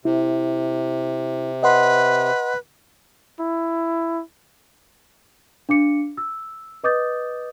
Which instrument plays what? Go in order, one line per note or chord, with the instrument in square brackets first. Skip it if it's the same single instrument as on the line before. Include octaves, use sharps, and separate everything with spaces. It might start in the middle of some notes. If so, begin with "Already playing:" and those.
[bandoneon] C3 [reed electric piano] E4
[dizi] B4 [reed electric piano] D#5 F#5 C6
[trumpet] E4
[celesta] D4 F5 D6 C#7
E6
B4 D#5 D6 D#6 G6 A6